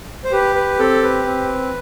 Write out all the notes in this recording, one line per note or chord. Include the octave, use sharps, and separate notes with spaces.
C5
G4 B4
B4
C4 A4
B4
C4